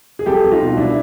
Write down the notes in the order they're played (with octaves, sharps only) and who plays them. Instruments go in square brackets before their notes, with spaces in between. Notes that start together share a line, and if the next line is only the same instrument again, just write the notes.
[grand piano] G#4
C2 G4 A4
C2
D#4 F4
B2
C2 D4 E4